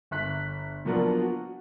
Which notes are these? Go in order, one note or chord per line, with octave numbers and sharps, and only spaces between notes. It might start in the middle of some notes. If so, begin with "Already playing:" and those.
G1 E5 F#6 B6
F3 F#3 A#3 B3 D4 F4
F#4